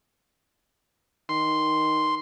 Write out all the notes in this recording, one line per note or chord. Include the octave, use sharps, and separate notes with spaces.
D#3 C6